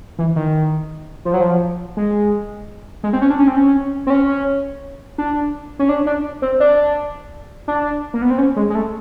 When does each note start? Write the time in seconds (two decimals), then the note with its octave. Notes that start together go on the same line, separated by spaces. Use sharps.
0.19 E3
0.36 D#3
1.25 F3
1.34 F#3
1.41 F3
1.97 G#3
3.04 G#3
3.13 C4
3.22 C#4
3.30 D4
3.39 C#4
3.47 C4
3.57 C#4
4.07 C4
4.10 C#4
5.18 D4
5.79 C#4
5.89 D4
6.06 D4
6.42 C4
6.60 D4
7.68 D4
8.14 A#3
8.22 B3
8.30 C4
8.38 C#4
8.56 G#3
8.70 G#3
8.75 A3